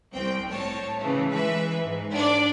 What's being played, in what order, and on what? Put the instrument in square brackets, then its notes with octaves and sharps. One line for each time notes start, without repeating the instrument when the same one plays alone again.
[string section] C2 C4 G5
A2 C#5 A5
C#3 E3 A3
E3 G#3 B4 E5
G#2
D4 D5